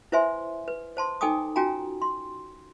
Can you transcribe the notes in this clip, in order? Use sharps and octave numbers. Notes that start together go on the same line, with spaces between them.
E4 B4 C5 E5 G#5 C6
B4
C5 A5 C6
D#4 A4 G5 G#5 D6 D#6
C#4 F4 F#4 G5 G#5 A#5
C6